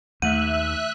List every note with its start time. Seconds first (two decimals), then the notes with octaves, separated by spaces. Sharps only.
0.22 D#2 A3 E5 F#6 D#7